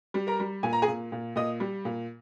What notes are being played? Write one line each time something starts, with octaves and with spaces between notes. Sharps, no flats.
G3
A#4 A#5
G3
A#2 G#5
A#5
G#4 G#5
A#2
A#2
A#2 D#5 D#6
G3
A#2